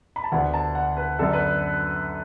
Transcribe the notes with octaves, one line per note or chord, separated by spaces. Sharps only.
B5
A5
D2 D3 B3 D4 F#5
A5
F#5
B4
F#2 D3 B3 D4 A4
B4